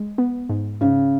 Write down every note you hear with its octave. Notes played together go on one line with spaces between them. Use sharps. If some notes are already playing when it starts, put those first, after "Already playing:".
Already playing: G#3
B3
G#2
G#2 C#3